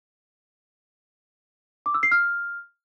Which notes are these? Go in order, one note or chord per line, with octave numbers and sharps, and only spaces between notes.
D6
E6
C7
F6